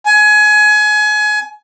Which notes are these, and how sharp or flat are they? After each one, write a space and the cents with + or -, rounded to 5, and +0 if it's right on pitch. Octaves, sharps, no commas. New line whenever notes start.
G#5 +25